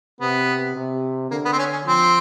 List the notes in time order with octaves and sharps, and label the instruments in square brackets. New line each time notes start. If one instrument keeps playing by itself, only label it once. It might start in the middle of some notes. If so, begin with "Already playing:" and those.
[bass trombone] C3 [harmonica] B3
[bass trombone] C3
[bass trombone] D3 [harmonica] A#3
[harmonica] B3
C4
C#4
C#4
[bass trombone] F3 [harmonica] C4